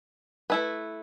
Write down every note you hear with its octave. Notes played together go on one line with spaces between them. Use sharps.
A3 E4 B4